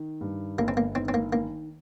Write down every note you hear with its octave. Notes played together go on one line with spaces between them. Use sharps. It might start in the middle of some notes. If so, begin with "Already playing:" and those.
Already playing: D#3
G2
G1 A#3
C4
A#3
D#3 C4
C4
A#3
D#3 A#3